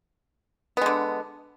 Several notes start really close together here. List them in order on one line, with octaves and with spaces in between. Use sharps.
B3 G#3 D3